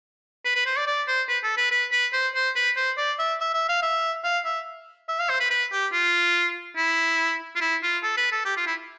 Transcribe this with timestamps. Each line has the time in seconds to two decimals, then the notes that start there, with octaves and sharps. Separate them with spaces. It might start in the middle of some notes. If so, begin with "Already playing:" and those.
0.45 B4
0.55 B4
0.66 C5
0.77 D5
0.87 D5
1.08 C5
1.29 B4
1.43 A4
1.57 B4
1.71 B4
1.92 B4
2.13 C5
2.35 C5
2.56 B4
2.76 C5
2.98 D5
3.19 E5
3.40 E5
3.54 E5
3.69 F5
3.82 E5
4.24 F5
4.45 E5
5.08 E5
5.19 F5
5.29 C5
5.40 B4
5.50 B4
5.72 G4
5.93 F4
6.77 E4
7.55 F4
7.61 E4
7.83 F4
8.03 A4
8.17 B4
8.32 A4
8.45 G4
8.57 F4
8.67 E4